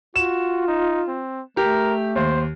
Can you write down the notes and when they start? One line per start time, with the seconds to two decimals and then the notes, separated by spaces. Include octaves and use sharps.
0.16 F4 F#4 E7
0.68 D#4
1.08 C4
1.57 A3 G4 A#4
2.16 D#2 C5